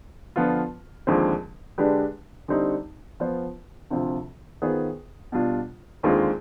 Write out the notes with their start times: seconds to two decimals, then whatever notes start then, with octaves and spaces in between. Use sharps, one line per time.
0.36 D3 F3 B3 F4
1.07 D#2 D3 F3 G#3 C4
1.78 D3 G#3 D4 G4 B4
2.48 D3 G3 C4 D#4 G4
3.20 F3 B3 F4 C5
3.91 D2 C3 F3 C4 F4
4.62 D#3 B3 F4 G#4 C5
5.32 B2 G3 D4 F4
6.03 D#2 D3 G#3 C4 F4